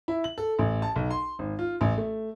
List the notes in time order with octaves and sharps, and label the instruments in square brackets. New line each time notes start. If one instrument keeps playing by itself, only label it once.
[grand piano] E4
F#7
A4
A1
A5
B1
C6
G#1
F4
A1
A3